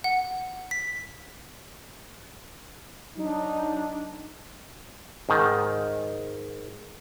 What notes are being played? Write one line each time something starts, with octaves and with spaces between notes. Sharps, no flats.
F#5
B6
F#3 D4 D#4
G#2 D#3